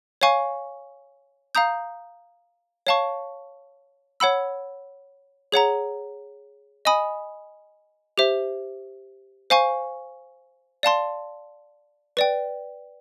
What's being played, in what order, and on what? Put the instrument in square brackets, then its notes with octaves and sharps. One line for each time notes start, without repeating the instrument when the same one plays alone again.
[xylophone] C#5 F5 G#5 C#6
F5 A#5 D#6 G6
C#5 F5 A5 C#6
C#5 F#5 B5 E6
G#4 C#5 F#5 A#5
D#5 G#5 B5 D#6
G4 C5 E5
C5 F5 G#5 C#6
D5 F5 A5 C6
B4 D5 G5